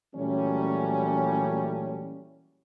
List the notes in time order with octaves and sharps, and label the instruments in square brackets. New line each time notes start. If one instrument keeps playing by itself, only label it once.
[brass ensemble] A#2 E3 F#3 G3 A3 C#4